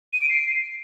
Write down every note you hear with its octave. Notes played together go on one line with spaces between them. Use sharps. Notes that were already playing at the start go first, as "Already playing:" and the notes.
D#7
D7
C7